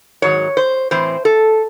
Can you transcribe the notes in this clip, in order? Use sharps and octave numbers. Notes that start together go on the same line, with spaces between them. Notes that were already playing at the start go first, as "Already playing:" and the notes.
G#2 D#3 F#3 C#5
C5
A2 E3 C4 C5
A4